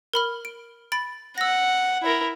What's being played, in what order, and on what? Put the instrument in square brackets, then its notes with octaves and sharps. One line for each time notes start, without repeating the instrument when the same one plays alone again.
[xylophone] A#4 B5 F6
D7
B5 A6 D7
[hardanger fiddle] F#5 [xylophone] E6 A#6
[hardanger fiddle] E4 A#4